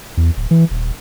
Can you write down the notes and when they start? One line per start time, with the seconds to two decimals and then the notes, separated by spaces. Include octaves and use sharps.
0.17 E2
0.36 D1
0.51 E3
0.70 D#1